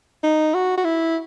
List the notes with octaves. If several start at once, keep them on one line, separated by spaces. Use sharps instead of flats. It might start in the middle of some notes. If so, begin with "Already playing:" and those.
D#4
F#4
F#4
E4